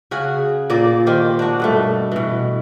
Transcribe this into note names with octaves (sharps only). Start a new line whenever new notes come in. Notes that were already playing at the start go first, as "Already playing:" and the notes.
C#3 F#4 G#4
A#2 A#3 D5
D#3 G4 C5
D4 F#4
G2 B2 A3
B2 E3